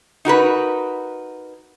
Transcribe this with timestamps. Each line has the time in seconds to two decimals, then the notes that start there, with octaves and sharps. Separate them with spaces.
0.25 D#4 F#4 A#4 B4